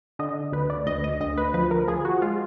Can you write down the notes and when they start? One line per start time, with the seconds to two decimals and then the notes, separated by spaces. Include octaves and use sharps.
0.19 D3 D#5
0.52 D2 B4
0.70 D5
0.86 D2 D#5
1.04 D#5
1.21 D2 D#5
1.38 B4
1.54 F3 B4
1.71 A#4
1.88 F3 G#4
2.05 F#4
2.22 G#3 F4